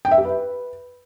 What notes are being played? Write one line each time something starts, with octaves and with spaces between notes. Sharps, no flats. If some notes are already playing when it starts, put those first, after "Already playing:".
G5
E5
G4
B4